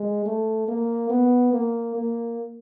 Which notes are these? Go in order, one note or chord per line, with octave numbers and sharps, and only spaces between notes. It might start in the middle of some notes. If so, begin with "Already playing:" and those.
Already playing: G#3
A3
A#3
B3
A#3
A#3